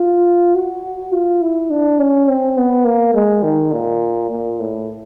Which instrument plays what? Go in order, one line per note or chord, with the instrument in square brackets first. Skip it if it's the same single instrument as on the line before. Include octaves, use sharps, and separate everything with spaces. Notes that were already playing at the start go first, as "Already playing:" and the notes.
Already playing: [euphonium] F4
F#4
F4
E4
D4
C#4
C4
B3
A#3
G#3
D#3
A#2
A#2
A2